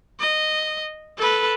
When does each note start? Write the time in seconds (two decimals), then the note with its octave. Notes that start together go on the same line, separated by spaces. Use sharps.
0.20 D#5
1.18 A4 B4